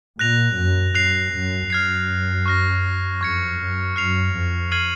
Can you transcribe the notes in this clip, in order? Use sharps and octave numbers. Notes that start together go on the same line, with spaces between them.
A#2 F#6 A#6 F7
F#2
F#2 F#6 C7 F7
F#2
F#2 F6 G#6 C7
C#6 F6 A#6
F2 C#6 G#6 C#7
F#2
F#2 F6 C7 F7
F2
F6 G#6 C7 D#7 F#7